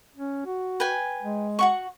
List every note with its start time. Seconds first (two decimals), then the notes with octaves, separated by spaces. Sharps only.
0.15 C#4
0.46 F#4
0.80 B4 G5 G#5
1.23 G#3
1.59 F#4 F#5 C#6